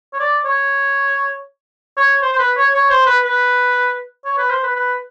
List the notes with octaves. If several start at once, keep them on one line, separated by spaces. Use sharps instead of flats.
C#5
D5
C#5
C#5
C5
C5
B4
C#5
C#5
C5
B4
B4
C#5
B4
C5
B4
B4